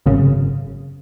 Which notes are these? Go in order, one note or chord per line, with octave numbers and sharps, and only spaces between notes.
G#1 F#2 C#3